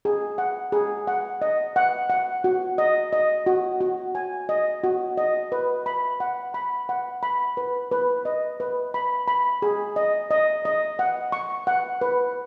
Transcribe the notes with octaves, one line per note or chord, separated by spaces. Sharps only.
G#4
F#5
G#4
F#5
D#5
F#5
F#5
F#4
D#5
D#5
F#4
F#4
G#5
D#5
F#4
D#5
B4
B5
F#5
B5
F#5
B5
B4
B4
D#5
B4
B5
B5
G#4
D#5
D#5
D#5
F#5
C#6
F#5
B4